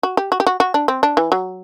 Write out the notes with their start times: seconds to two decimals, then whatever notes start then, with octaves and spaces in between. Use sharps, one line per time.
0.03 F#4
0.17 G4
0.32 F#4
0.40 G4
0.47 F#4
0.60 F#4
0.74 D4
0.88 C4
1.03 D4
1.17 E3
1.32 F#3